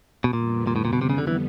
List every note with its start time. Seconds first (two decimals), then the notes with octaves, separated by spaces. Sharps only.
0.24 B2
0.33 F2 A#2 D3 G3 B3
0.67 A#2
0.76 A2
0.85 A#2
0.93 B2
1.02 C3
1.10 C#3
1.18 D3
1.27 E3